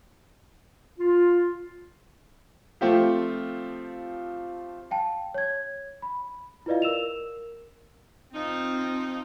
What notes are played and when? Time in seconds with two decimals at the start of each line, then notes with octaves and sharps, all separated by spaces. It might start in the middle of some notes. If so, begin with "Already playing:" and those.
0.99 F4
2.81 F3 A3 C4 F4 G4
4.91 F5 G5 A5
5.34 C#5 G#6
6.02 B5
6.66 E4 F4 B4 D5 D#5 F5
6.82 A#4 E6 E7 F7
8.34 F3 C4 D#4